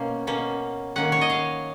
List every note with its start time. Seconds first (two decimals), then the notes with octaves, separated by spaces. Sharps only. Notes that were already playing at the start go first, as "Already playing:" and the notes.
Already playing: B2 A#3 C#4 F5
0.27 B2 A#3 C#4
0.96 D#3 A#3 C#4 F#5
1.12 C#5
1.21 D#5
1.30 F5